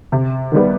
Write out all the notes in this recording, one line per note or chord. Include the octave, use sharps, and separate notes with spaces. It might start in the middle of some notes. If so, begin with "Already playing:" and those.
C3
D#3 G3 B3